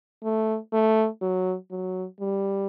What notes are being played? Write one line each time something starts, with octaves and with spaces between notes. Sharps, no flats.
A3
A3
F#3
F#3
G3